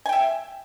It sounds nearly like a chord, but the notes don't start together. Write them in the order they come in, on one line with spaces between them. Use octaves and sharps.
G#5 G5 E5